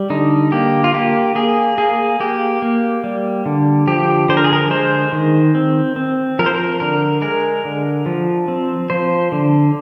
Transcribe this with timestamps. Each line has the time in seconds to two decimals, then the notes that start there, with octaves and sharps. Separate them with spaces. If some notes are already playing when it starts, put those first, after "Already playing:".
Already playing: G3
0.10 D3 D#4
0.52 A#3 G4
0.84 F4
0.93 A#3 G4
1.35 A#3 G#4
1.78 A#3 G#4
2.20 A#3 G4
2.62 A#3
3.04 G3
3.46 D3
3.87 F3 G4
4.29 D3 C5
4.37 A#4
4.44 G#4
4.53 A#4
4.70 G#3 C5
5.12 D#3
5.55 C4
5.96 C4
6.39 F3 A#4
6.46 C5
6.54 A#4
6.80 D3 A#4
7.22 G#3 A#4
7.65 D3
8.06 F3
8.48 C4
8.90 F3 C5
9.32 D3